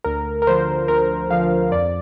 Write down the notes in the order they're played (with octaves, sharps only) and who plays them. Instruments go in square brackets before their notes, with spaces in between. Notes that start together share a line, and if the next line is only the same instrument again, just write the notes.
[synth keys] D2 A#4
A#4
D3 F3 C5
D2 A#4
D3 F3 F5
F2 D5